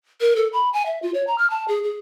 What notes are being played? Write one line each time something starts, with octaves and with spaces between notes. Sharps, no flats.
A#4
A4
B5
G#5
E5
F4
C#5
A#5
F6
A5
G#4
G#4